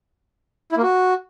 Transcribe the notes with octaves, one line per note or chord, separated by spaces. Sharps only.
E4
A#3
F#4